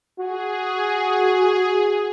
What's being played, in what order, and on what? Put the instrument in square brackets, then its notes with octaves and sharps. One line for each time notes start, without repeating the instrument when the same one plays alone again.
[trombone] F#4 [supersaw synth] G#4